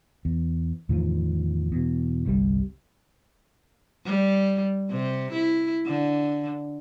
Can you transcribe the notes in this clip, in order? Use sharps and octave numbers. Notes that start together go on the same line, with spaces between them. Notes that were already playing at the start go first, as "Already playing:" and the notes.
E2
E2 A2 D#3 F3
E2 B2
G1 C2 C3 G3
G3
C3
E4
D3